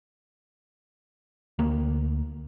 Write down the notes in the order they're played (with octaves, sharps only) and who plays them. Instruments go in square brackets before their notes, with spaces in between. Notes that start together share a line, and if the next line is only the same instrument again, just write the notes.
[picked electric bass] D2 A#3